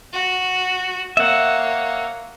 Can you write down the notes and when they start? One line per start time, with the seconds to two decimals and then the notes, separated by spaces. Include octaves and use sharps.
0.13 F#4
1.17 A#3 C#5 E5 F#5